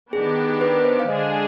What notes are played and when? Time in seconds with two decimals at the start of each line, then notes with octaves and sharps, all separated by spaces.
0.13 D#3 B3 D4 G4 G#4
0.61 B4
0.85 C5
1.00 F5
1.08 D3 G#3 D4 G#4 D#5